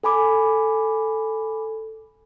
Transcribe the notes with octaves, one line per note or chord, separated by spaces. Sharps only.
A4 G#5 B5 D6